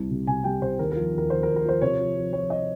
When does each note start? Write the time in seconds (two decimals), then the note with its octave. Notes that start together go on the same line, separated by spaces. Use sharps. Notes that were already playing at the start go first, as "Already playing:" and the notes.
Already playing: C2 C3
0.11 C3
0.27 C3 G#5
0.44 G3 G5
0.61 C3 C5
0.79 D#2 A#4
0.92 A#4
0.96 F3
1.14 D#2 A#4
1.30 D#2 C5
1.43 A#4
1.48 D#2
1.56 A#4
1.64 F3 C5
1.82 C3 C#5
1.99 F3
2.16 F3
2.33 F3 C#5
2.50 D#5